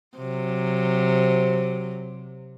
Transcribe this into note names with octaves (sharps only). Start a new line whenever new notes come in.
C3 F#3